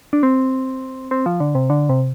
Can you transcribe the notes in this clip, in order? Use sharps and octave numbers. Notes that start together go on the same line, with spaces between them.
D4
C4
C4
F3
D3
C3
D3
C3